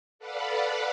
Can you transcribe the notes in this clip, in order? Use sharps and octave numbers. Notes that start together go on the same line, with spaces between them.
A4 B4 D5 F5 F#5 B5